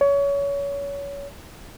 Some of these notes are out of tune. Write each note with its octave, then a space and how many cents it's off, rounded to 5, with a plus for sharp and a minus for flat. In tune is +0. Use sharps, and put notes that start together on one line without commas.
C#5 +25